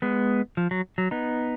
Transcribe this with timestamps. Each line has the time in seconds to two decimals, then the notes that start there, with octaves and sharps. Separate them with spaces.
0.02 G#3 B3
0.57 F3
0.71 F#3
0.98 F#3
1.11 B3 D#4